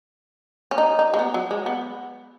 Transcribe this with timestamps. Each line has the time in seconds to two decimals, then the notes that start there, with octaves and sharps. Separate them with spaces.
0.71 C#4
0.78 D#4
0.99 D#4
1.14 G#3
1.19 B3
1.34 F#3
1.51 G#3
1.66 B3